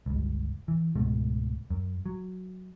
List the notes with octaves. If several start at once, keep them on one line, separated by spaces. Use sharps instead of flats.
G1 C#2
E3
C#2 G#2 B2 A3
F#2
F#3